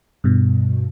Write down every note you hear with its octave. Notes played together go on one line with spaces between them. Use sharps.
G2 B2